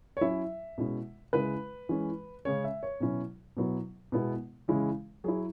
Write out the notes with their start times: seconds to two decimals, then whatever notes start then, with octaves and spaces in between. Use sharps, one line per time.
0.17 C#5
0.21 F#3 C#4 E4 E5
0.78 B2 G#3 C#4 E4
1.33 C#3 G#3 E4 B4
1.89 E3 G#3 C#4
2.45 C#3 G#3 C#4 C#5
2.64 E5
2.83 C#5
3.00 B2 F#3 C#4 E4
3.57 B2 F#3 B3 E4
4.12 B2 G#3 B3 E4
4.68 C#3 E3 G#3 C#4 E4
5.24 F#3 E4 G#4